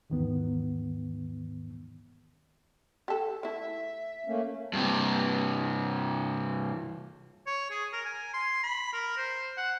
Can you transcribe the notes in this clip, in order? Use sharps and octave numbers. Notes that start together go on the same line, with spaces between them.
D#2 G#2 D#3 E3 B3
G4 A4
A3 E4 E5
A3 A#3 C#4
G2 C3
C#5
G#4
A#4
G#5
C6
B5
A#4
C5
F#5